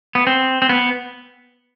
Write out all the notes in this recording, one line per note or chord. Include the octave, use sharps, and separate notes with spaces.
B3
C4
C4
B3